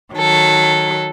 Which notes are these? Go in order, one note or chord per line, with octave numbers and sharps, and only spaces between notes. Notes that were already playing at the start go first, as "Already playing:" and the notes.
D#3 F#3 A4